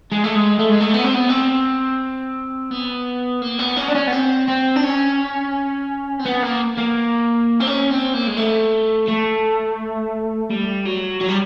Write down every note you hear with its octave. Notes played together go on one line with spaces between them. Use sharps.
G#3
A3
G#3
A3
G#3
A3
B3
C4
B3
C4
B3
A#3
B3
C#4
D4
C#4
B3
C4
C4
D4
C#4
C4
B3
A#3
A#3
C4
C#4
C4
A#3
G#3
A3
A3
G3
F#3
F#3
G3